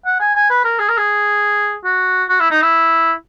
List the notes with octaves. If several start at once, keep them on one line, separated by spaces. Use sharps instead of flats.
F#5
G#5
G#5
B4
A#4
G#4
A#4
G#4
F#4
F#4
E4
D#4
E4